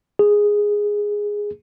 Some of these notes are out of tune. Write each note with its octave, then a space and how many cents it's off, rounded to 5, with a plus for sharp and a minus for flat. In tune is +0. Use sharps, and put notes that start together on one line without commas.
G#4 -5